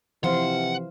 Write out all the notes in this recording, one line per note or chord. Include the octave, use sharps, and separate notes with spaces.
C3 E3 F3 C5 F5 F#5